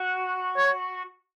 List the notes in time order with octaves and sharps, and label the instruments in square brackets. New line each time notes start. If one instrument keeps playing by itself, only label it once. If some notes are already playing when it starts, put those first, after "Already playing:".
Already playing: [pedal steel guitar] F#4
[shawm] C#5